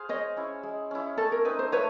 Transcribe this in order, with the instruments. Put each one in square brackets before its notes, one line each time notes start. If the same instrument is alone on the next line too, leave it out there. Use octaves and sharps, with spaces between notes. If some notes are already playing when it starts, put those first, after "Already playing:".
Already playing: [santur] G#4 C5 F5
[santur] G#3 [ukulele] C#5 D#5
[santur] C#4 E4
G#3
C#4 E4
[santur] A3 [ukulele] A4
[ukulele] A#4
[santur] C4 D#4 [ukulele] B4
[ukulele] C5
[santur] A3 [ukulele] B4 C#5